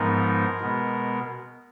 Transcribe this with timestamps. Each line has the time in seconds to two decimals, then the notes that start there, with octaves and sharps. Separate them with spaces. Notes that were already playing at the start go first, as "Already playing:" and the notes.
Already playing: G#2 F3 G#3 B3 D#4 A#4
0.61 B2 G#3 B3